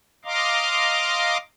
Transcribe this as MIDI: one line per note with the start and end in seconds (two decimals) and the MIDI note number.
0.25 1.37 75
0.25 1.37 77
0.25 1.37 82
0.25 1.37 84
0.25 1.37 86